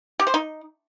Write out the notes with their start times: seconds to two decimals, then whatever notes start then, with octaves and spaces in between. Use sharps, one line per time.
0.20 G4
0.27 C5
0.34 D#4